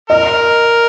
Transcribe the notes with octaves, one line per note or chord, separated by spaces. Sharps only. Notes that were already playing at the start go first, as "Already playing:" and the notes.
A#4 D#5